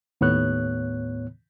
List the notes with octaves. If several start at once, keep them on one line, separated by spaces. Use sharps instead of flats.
D#2 A2 B3 C#5 F#6